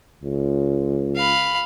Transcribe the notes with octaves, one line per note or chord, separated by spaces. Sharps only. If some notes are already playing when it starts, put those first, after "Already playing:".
C#2
F5 B5